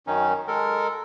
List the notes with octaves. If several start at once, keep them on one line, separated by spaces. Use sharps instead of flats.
F#2 D#3 C#4 D#4
G#3 A4 A#4